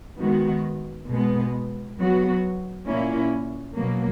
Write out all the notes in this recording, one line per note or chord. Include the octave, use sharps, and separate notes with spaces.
D#3 G#3 B3 F#4
B2 G#3 B3
F#3 B3 F#4
A#2 A#3 C#4 E4
B2 F#3 A#3